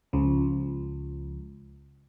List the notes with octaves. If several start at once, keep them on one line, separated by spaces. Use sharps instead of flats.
C#2 F3